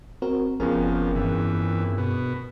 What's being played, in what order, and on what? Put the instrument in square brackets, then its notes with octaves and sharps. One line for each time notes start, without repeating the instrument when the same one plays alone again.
[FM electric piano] C4 F#4 A#4
[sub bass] F#1 [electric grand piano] F2 B3 C#4 [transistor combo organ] F3 [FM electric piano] G#4 A#4
[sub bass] G2 [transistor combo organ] E3
[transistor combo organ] B2